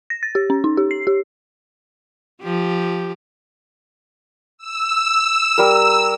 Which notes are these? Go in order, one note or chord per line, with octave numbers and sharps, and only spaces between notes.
A#6
A6
G4
C#4
D#4
G4
C7
G4
F3 G4
E6
G3 A#4